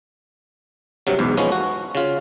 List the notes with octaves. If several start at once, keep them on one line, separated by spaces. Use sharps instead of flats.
G2 C3 F#3
B1 E2 G#2
F3 G#3 B3 C#4
F#4
C#3 F4